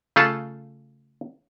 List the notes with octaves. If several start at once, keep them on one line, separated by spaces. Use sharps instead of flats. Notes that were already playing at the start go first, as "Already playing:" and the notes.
C#3 A3 F4 G#4 A4 A5